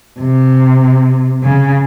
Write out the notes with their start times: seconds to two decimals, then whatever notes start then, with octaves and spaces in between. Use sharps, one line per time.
0.20 C3
1.43 C#3